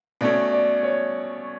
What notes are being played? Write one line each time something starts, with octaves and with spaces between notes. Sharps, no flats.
B2 A3 C#4 D5
D5
C#5